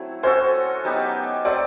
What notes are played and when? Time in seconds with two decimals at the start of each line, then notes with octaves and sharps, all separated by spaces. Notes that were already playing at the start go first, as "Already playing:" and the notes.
Already playing: F#3 A3 C4 E4
0.23 C#4 F#4 A4 C5
0.84 F#3 B3 D#4 G4
1.45 F#3 A3 C4 D5